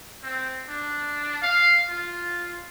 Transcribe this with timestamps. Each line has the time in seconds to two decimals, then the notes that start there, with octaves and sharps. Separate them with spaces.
0.23 C4
0.68 D4
1.42 F5
1.89 F4